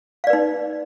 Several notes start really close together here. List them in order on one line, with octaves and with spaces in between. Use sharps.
F5 D5 B4 D#4